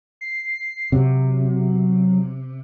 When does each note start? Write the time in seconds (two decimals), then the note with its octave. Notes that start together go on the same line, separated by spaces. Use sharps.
0.21 C7
0.92 C3 F#3